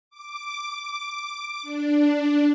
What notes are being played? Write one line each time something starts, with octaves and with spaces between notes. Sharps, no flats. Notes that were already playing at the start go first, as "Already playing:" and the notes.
D6
D4